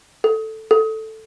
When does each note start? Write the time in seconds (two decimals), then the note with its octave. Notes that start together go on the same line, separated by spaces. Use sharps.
0.24 A4
0.71 A4